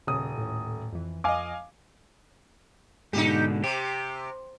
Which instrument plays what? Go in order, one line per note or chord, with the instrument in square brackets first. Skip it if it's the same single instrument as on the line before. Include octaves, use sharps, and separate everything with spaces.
[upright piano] D#1 D#6 [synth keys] C#3
[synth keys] A2
F2 E3
[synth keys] F2 D#5 [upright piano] F5 G#5 D6
[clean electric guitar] G#2 B2 D3 [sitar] D#4 G4
[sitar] C3 [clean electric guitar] G4